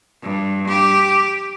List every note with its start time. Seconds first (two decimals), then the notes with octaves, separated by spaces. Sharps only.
0.22 G2
0.68 G4